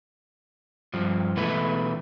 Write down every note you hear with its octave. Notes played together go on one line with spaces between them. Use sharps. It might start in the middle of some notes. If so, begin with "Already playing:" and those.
G2 F3
B2 E3 A3 E4 B4